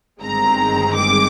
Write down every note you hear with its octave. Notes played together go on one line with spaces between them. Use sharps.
G1 G2 D#3 G#3 C4 A#5
D6